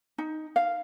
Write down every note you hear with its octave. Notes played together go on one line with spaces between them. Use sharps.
D#4
F5